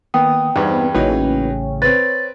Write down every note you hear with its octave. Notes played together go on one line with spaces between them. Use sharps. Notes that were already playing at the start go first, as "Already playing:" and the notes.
D#3 A#3 B3 G5 D#6
E2 G2 B3 C4 D#4 B4
A1 C#3 F#3 A#3 C#4 D#4 E4 B4
C4 B4 C#5 A6